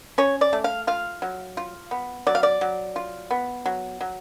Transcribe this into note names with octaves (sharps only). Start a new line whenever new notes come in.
C#4 C#5
D5
A3
F5
F4 F5
F#3
F4
B3
F#3 D5
F5
D5
F#3
F4
B3
F#3
F#3